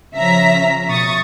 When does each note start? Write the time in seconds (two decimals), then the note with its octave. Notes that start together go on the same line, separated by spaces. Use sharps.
0.14 C#3 F3 C#4 E5 A#5 B6
0.88 B2 C#6 D#6 A6